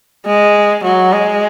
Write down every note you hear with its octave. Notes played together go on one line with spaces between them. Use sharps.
G#3
F#3
G#3